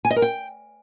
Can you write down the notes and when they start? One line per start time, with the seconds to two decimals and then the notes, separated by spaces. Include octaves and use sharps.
0.05 G#5
0.10 D#5
0.16 A#4
0.22 G5